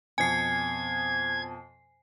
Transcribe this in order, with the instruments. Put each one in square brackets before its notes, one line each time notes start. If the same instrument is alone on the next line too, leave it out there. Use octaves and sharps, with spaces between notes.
[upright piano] F2 B2 [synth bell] G#5 C7 [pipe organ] G#6